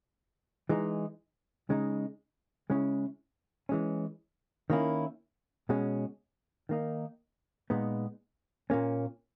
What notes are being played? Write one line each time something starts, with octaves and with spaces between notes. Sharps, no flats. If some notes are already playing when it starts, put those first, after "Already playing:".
E3 G#3 D#4
C#3 G#3 D#4
C#3 G#3 C#4 E4
E3 G#3 C#4
D#3 A#3 C#4 E4
B2 G#3 C#4
D#3 A#3 D#4
A#2 G#3 B3 D#4
A#2 A#3 C#4